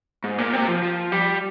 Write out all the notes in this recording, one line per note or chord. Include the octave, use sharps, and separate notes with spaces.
G#2
A#2
C3
F3
F3
G3